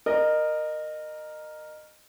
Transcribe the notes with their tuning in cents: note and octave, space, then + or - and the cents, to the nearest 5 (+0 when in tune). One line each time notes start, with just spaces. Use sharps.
A#4 +0 D#5 -25